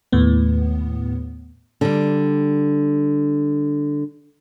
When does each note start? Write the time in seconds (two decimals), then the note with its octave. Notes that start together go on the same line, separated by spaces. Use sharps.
0.12 D#2 A2 B3
1.81 D3 G3